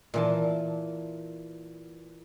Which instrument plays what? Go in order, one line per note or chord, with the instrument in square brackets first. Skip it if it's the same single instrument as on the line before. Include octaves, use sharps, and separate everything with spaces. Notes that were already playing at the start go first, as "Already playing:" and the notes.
[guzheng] A#2 E3 A5